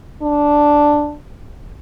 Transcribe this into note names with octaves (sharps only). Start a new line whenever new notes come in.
D4